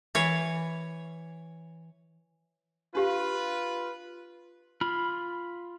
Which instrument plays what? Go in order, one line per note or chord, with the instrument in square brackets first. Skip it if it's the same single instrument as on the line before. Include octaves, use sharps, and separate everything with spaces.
[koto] E3 C#5
[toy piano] D4 G4 F5 [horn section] F4 B4
[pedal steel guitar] F4 B5 F6